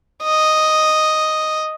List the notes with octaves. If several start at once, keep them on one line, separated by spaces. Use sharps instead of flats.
D#5